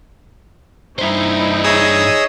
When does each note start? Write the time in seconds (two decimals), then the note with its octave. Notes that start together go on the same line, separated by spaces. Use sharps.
0.99 G2 D#4 E4 C5
1.64 G#4 C#5 D#5 D#6 E6